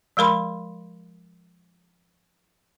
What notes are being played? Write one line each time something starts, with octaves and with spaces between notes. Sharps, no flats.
F3 G#3 A#4 B5 C6